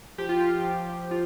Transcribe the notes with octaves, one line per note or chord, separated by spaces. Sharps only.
F3 G4
F4
F3 G4
F3
F3
F3 F4